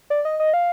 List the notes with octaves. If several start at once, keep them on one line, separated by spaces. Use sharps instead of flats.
D5
D#5
D#5
F5